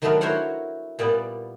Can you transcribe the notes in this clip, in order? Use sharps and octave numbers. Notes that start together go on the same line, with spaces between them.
D#3 F#3 A3 B3 D4 A#4
E4 F#4 A#4 C5 C#5 F#5
A#2 G3 B3 D5